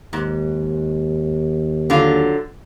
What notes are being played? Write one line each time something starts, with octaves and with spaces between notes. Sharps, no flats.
D#2 G#2
D3 F#3 F4